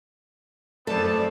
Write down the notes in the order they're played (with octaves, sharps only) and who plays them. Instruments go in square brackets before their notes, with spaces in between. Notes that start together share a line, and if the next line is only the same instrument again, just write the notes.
[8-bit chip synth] F#2 A3 [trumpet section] B3 C4 A5 [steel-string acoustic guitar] A4 [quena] D5